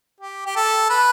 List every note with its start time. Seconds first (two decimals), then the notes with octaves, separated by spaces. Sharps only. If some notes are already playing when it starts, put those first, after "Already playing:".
0.20 G4
0.46 G4
0.56 A4
0.90 B4